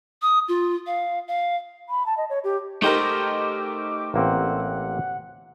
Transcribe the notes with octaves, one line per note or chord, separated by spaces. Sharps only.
D#6
F4
F5
F5
B5
A5
D#5
C#5
G4
A3 D#4 G4 A#4 C5 D6
A1 A#3 C4 F#5